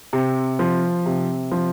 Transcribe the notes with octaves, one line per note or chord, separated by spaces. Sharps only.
C3
F3
C3
F3